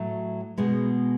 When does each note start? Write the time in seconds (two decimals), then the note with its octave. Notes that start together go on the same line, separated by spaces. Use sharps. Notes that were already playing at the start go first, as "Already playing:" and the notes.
Already playing: A2 F#3 A3
0.58 B2 G#3 B3